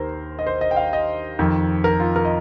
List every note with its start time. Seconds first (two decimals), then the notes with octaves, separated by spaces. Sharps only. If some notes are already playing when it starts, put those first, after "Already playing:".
Already playing: D#2 D#3 A#4 C5
0.39 D#5
0.47 C5
0.61 D#5
0.71 G5
0.77 F5
0.93 D#5
1.39 F2 D#3
1.84 A#4
2.00 F4
2.16 A#4
2.25 D#5